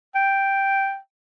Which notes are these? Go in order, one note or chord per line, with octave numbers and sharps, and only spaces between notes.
G5